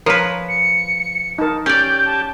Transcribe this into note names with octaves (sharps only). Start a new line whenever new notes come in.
F3 A#4 B4 C#5
C#7
D#4 A#4 A5
C#4 G4 D5 G6
A5